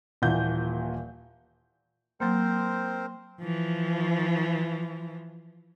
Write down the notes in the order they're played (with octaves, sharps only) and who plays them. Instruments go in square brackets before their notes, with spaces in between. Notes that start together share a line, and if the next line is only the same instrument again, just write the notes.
[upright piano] D#1 A#2 E3 F#5 G6
[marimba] F#3 A#3 [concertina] C4 A#4 C5
[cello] E3 F3